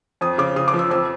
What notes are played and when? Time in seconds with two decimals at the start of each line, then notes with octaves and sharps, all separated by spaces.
0.21 F2 D#6
0.38 C#3 D6
0.56 C#3 D#6
0.68 D6
0.74 F3
0.79 E6
0.91 F2 E6